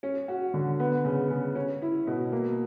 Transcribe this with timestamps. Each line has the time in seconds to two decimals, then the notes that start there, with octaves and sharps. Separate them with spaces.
0.03 C#4
0.28 F#4
0.54 D3
0.80 B3
1.05 C#3
1.30 C#3
1.55 C#4
1.82 E4
2.07 B2
2.32 A#3